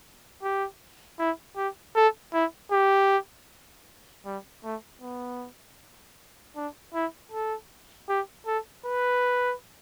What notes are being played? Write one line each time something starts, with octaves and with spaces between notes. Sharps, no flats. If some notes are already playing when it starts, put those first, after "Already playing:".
G4
E4
G4
A4
E4
G4
G3
A3
B3
D4
E4
A4
G4
A4
B4